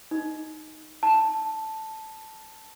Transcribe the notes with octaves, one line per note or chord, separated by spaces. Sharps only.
D#4
A5